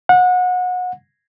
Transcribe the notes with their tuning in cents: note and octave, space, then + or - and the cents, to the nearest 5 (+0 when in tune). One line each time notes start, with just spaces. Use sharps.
F#5 -30